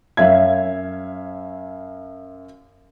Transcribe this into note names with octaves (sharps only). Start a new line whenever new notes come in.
F#2 E5 F5 G#6